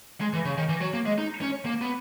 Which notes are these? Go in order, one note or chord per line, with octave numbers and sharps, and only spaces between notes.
G#3
E3
C#3
D#3
E3
F#3
A#3
G#3
D#4
C#4
A#3
B3